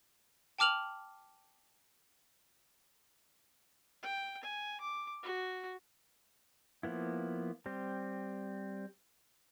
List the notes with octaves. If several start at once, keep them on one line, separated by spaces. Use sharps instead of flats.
G5 A5 D6 F6 F7 F#7
G5
G#5
D6
F#4
F3 A#3 B3 E4
G3 C4